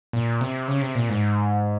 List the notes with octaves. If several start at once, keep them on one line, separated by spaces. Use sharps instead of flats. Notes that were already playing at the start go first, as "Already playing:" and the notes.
A#2
C3
C#3
C3
A#2
G#2